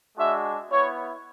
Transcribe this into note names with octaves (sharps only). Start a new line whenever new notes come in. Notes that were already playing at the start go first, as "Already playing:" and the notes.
G#3 D4 F#4 E5
B3 E4 C#5